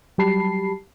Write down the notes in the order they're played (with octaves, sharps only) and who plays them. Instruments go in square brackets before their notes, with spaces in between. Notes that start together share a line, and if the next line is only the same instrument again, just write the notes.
[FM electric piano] F#3 G3 G4 A5 B5 C7